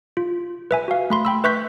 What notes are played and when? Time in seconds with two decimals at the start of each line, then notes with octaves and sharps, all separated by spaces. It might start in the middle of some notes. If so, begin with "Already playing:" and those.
0.17 F4
0.71 B4 E5 G#5
0.88 F#4 F5
1.10 A3 B5 C6
1.25 G5 B5 E6
1.44 B4 E5 C#6 F#6 G6 B6